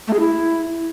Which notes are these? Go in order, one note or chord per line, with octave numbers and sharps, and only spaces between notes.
A3
G#4
E4